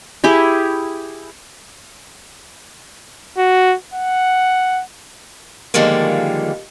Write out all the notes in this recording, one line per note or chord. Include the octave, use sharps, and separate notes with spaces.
E4 G4 G#4
F#4
F#5
D3 D#3 F3 G3 G#3 A#3